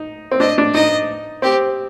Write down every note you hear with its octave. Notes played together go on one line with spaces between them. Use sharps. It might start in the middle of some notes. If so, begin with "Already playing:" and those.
Already playing: D#4
C4
D4 D#5
D4
D#4 D#5
C4 G4